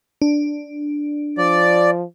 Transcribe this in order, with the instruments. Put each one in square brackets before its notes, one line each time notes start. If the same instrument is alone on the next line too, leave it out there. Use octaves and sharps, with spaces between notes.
[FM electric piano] D4
[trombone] F3 [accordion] D5